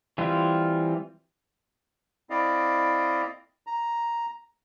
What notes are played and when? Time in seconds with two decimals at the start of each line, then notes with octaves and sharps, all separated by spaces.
0.18 E3 G3 C4 F4
2.30 C4 E4 D5 D#5 F5
3.67 A#5